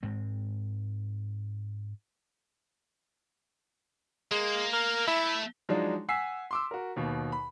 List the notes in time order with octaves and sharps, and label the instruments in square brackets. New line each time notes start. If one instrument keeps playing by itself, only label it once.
[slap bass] G#2 G#3 C4
[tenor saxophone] G#3 [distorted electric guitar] A#3
[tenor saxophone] A#4
[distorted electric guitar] A3 [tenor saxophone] E4
[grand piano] F3 F#3 G#3 D4 D#4
F#5 G#5 E6 B6 C7
C6 D6 E6
F#4 A#4
D#2 B2
B5